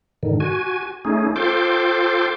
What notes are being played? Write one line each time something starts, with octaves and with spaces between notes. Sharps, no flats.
G#2 D3 D#3
F#4 G#5
A3 C#4 D#4 G#4
F4 A4 C5 G5 C6 D6